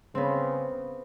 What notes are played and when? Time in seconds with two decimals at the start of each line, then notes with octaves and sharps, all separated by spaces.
0.15 C#3 B3 C4